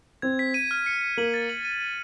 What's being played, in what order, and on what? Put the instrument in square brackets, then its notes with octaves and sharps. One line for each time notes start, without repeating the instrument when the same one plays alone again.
[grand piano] C4 [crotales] G#6
[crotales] B6
D#7
F6
C#7
C#7
[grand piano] A#3 [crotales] F#7
[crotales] A6
F#7
D#7
D#7